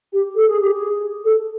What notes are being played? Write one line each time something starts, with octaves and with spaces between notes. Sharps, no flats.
G4
A4
G#4
G4
G#4
A4